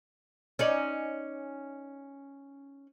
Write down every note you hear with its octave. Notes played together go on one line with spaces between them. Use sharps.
C#4 D#4 D5